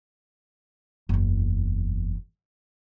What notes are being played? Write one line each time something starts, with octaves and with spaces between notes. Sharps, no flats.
F#1 E2